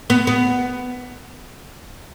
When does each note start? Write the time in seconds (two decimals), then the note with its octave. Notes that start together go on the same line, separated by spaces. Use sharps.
0.10 B3
0.27 B3